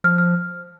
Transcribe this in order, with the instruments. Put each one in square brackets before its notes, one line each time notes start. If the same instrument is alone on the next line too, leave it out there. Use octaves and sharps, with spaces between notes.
[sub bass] F3 [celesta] F6
[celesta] F6